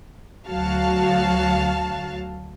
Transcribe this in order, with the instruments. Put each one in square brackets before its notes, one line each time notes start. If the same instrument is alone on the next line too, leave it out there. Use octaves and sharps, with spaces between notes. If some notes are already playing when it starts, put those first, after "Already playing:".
[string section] D2 F#3 F#4 F5 A5